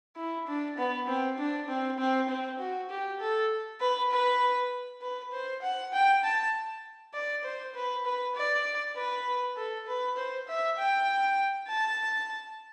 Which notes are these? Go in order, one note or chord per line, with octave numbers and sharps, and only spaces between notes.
E4
D4
B3
C4
D4
C4
C4
C4
F#4
G4
A4
B4
B4
B4
C5
F#5
G5
A5
D5
C5
B4
B4
D5
B4
A4
B4
C5
E5
G5
A5